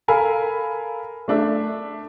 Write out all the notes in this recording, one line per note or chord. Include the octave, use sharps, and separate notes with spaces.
A4 A#4 F5 G#5 B5
A3 D4 E5